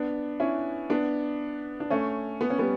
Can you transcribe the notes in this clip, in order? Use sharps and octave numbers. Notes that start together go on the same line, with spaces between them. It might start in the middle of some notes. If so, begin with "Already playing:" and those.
Already playing: B3 D4
C#4 E4
B3 D4
D4
A3 C#4
B3
C#4
G3 B3